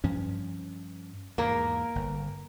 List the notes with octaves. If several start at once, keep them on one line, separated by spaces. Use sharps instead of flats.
G2 F3 C#4
E2 G#2 A#3 A#4
G1